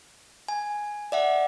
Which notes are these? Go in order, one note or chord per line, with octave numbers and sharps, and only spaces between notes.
G#5
D5 E5 F#5